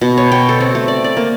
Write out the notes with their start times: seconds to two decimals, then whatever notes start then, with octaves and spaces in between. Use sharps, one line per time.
0.01 B2
0.18 C#5
0.32 G5
0.49 A4
0.60 C4
0.75 A3
0.88 D5
1.04 D5
1.17 A#3